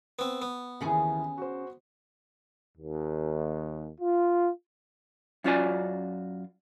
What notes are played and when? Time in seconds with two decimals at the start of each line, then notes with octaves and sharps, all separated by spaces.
0.19 B3 C4
0.42 B3
0.81 D#2 C#3 E3 C#4 G#4
1.37 F#4 C5
2.77 D#2
3.99 F4
5.44 F#2 C#4 F4 F#4 D5 G#5